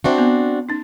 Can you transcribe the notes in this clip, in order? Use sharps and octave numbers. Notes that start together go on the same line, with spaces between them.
C4 D4 F#4 E5
B3
C#4 D#4